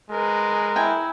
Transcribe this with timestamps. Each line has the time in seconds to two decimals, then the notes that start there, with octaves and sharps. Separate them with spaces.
0.10 G#3 A#4 B4
0.76 E4 G5 G#5